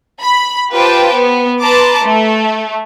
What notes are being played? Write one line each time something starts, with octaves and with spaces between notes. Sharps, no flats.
B5
F4 G4 B4 C5 G5 A5
B3
B4 A5 A#5 C6 D6
A3